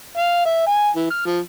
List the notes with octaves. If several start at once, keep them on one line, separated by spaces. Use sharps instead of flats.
F5
E5
G#5
E3
F6
F3